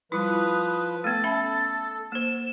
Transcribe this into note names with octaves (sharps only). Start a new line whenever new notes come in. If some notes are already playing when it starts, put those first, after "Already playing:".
F3 G3 E4 B4 D#6
A3 B3 A4 A6
C#4 E5 B5
A#3 C5 E7